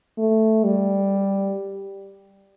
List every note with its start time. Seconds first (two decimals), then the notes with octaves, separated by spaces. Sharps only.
0.18 A3
0.64 G3